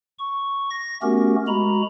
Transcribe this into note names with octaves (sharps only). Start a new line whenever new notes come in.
C#6
A#6
A3 B3 C#4 F#4 G4 A#4
G#3 F#4 A#5 B5